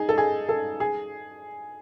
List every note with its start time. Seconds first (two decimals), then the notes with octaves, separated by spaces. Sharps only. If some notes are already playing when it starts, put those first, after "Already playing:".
Already playing: D#4 G#4
0.09 A4
0.18 G#4
0.49 A4
0.80 G#4